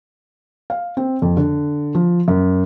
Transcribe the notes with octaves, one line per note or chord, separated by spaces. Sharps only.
F5
C4
F2
D3
F3
F#2